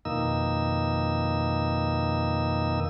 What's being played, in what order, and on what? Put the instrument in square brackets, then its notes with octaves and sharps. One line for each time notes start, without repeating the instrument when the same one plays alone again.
[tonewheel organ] F2 B2 D#3 A#3 D#4 E6